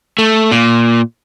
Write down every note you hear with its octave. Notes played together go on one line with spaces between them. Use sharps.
A3
A#2